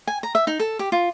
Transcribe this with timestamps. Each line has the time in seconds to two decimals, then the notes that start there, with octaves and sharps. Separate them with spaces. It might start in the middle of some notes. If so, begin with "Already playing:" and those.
0.07 G#5
0.23 A#5
0.35 E5
0.47 D#4
0.60 A4
0.79 G4
0.92 F4